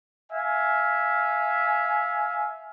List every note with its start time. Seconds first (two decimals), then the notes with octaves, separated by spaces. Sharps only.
0.33 E5 F5 G#5